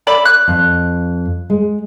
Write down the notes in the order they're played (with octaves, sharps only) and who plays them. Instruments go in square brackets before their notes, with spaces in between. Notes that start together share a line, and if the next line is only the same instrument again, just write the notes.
[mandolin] D5 E5 B5
F#6
[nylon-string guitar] F2
G#3